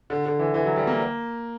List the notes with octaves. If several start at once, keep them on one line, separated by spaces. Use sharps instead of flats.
D3
D3
E3
E3
F#3
G3
A#3